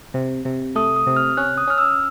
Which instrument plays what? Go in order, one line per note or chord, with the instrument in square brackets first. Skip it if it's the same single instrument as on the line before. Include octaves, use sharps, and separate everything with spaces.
[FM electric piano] C3
C3
[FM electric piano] A3 [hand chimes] D#6
[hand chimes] D#6
[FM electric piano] C3
[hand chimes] F6
[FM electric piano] C#4 [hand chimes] F#6
[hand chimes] D#6
[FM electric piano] C#4 [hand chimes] F6
[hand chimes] E6